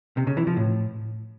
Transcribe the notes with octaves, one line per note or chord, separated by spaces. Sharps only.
C3
C#3
E3
F3
A2